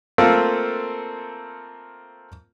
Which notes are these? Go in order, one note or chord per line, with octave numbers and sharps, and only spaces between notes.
A3 A#3 C4 F4 A4